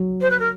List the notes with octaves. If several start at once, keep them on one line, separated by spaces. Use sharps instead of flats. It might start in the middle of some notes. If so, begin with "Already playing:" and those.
Already playing: F#3
C5
B4
A#4